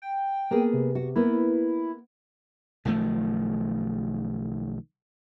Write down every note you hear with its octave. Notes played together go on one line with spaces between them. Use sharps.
G5
A#3 B3 G#4
C3
F#4
A#3 B3 E4
B1 D#3 F3 A3